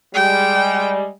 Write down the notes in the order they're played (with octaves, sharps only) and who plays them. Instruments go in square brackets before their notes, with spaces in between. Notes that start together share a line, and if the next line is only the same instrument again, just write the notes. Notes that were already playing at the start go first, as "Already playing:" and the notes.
[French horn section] G3 G#3 [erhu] G5